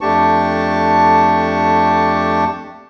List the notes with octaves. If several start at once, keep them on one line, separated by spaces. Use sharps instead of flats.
F2 A3 D4 G4 A5 C#6